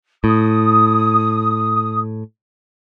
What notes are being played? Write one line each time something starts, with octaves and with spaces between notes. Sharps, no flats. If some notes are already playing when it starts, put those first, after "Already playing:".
A2 D#6